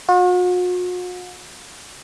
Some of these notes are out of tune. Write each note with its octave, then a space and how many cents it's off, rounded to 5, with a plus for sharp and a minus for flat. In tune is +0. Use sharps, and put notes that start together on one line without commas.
F#4 -45